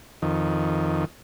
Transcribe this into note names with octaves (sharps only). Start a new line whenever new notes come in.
F2 D#3